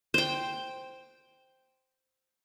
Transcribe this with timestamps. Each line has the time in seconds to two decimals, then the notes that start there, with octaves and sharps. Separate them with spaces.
0.14 C5 G5